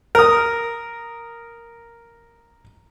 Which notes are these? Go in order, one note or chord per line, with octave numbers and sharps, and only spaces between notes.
A#4 D#6